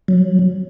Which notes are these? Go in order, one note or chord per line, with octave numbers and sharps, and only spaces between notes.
F#3